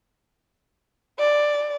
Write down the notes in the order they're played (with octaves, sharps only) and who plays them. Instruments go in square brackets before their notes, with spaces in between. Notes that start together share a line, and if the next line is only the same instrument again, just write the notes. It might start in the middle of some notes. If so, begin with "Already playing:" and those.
[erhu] D5